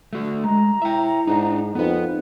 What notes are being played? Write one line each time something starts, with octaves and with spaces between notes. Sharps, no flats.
A3 F#4
G#3 A#5
E4 E5 G5
G#2 D4 D#4
F2 B3 D#4 B4